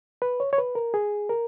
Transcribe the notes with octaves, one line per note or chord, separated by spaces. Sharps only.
B4
C#5
C#5
B4
A#4
G#4
A#4